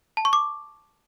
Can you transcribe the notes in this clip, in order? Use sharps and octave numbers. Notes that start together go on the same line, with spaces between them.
A5
C#6
D6